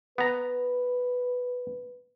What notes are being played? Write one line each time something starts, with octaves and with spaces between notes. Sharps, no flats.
B3 B4 A#5